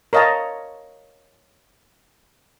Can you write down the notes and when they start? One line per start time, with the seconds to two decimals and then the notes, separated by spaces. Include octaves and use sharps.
0.13 A#4 C#5 D#5 F5 A5 A#5